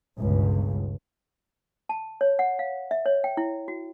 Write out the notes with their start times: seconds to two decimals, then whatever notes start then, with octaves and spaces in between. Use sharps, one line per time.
0.18 G1 C#2 G2 B2
1.89 A5
2.21 C#5
2.39 F#5
2.59 F5
2.91 E5
3.06 C#5
3.24 G5
3.37 E4
3.68 F#4